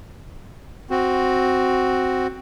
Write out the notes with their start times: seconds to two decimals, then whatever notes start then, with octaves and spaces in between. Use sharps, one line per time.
0.90 C4 F#4